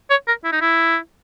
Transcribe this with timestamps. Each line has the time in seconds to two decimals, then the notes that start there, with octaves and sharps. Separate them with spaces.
0.10 C#5
0.27 A#4
0.44 E4
0.52 D#4
0.61 E4